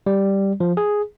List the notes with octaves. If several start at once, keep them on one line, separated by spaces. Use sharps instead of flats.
G3
F3
G#4